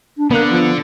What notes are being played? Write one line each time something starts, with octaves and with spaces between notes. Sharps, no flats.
D4
D3 A#3 B3 F#6
F3